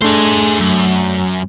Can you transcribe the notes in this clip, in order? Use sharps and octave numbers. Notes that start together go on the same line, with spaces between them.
A3 D4 G#4 C5
F#2